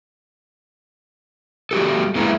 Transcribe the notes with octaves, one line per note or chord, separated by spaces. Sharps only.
G3 F#4 G4 A4
E2 G#3 A#3 E4 B4 A#5